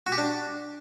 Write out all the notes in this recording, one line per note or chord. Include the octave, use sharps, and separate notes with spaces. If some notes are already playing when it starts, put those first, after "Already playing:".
F#4
G4
D4